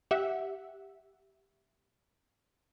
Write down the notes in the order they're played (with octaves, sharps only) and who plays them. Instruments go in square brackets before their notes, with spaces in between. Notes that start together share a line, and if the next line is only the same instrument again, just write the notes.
[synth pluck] G4 E5 F#5